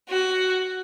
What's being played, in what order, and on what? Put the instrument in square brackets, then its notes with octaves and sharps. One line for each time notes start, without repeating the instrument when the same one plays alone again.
[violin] F#4